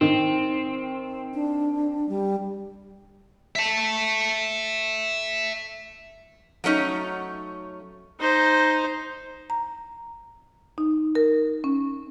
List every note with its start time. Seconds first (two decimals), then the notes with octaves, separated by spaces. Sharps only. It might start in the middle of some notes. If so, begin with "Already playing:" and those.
0.01 D#3 C4
1.34 D4
2.09 G3
3.56 E5 A5
6.64 F#3 A3 C#4 D#4
8.19 D#4 C5
9.50 A#5
10.78 D#4
11.15 A#4
11.64 C#4